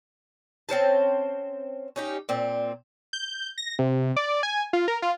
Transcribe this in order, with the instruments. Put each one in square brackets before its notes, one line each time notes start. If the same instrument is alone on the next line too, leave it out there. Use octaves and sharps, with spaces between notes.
[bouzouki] C4 C#4 C5 A5
C#4 D#4 G4
A#2 C4
[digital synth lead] G6
A#6
C3
D5
G#5
F4
A#4
F4